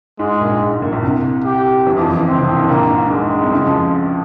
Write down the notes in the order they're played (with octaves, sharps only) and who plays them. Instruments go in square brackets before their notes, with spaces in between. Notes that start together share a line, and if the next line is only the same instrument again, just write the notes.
[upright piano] G#2 [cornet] G#3
[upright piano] A#1 A#2
G#2
G#2
A#1 A#2
A#1 A#2
C2 C3
[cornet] G4
[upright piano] E2 E3
F2 F3
E2 E3
C#2 C#3
[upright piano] C#2 C#3 [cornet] C4
[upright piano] C2 C3
C2 C3
C#2 C#3
[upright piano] A#1 A#2 [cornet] A#3
[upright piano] G#2
G2
[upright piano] G#2 [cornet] G#3
[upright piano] G2
G#2
C2 C3
C#2 C#3
F2 F3